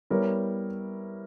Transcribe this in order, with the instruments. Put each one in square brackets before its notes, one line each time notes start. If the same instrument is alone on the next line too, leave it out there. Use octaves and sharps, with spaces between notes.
[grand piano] G3 B3 E4 A#4 C#5